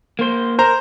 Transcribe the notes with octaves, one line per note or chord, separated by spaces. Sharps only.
A#3 C5
A#4 C5 A#5